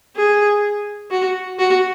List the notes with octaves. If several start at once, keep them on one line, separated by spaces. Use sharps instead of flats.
G#4
F#4
F#4